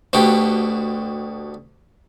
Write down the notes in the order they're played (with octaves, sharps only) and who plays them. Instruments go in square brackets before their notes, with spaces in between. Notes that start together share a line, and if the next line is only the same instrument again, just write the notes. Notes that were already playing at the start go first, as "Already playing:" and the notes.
[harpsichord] D2 B2 D3 G4